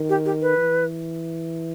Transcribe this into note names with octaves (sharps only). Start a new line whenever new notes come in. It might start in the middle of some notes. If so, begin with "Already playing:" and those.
Already playing: D#3
G4
G4
B4
E3